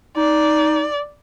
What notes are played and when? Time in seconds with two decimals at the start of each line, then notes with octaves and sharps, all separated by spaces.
0.17 D#4 D5